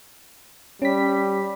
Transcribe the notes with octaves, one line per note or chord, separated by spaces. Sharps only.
G3 C#4 B6